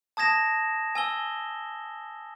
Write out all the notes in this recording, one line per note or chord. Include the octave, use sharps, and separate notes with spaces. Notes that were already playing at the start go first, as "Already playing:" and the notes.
A5 D#6 G#6 A#6 E7
G#5 E6 G7